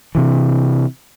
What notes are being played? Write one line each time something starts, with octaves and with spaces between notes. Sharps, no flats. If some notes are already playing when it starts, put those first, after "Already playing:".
C3 E3